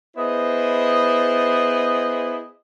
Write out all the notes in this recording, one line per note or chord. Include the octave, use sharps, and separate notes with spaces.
B3 E4 G#4 C5 D#5